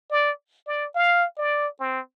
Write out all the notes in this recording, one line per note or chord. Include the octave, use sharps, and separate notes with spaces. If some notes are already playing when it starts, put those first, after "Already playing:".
D5
D5
F5
D5
C4